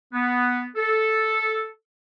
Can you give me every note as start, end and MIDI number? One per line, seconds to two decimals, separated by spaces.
0.13 0.65 59
0.76 1.67 69